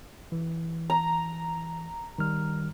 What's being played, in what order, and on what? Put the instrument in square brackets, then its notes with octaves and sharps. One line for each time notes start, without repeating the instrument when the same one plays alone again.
[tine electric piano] E3
[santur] A#5
[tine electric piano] D#3 G3 F6